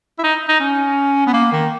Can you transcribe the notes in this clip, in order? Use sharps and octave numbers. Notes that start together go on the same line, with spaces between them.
E4
D#4
D#4
C#4
B3
A#3
D#3